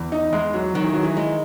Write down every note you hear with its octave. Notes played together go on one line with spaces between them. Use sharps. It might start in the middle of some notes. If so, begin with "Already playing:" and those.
Already playing: E2
D#4
E2 G#3
F#3
D#3 F#3
E3
F#3
E3
G#3